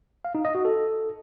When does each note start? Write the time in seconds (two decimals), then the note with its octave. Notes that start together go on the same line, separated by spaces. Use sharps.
0.25 F5
0.35 D#4
0.45 D#5
0.55 F#4
0.65 A4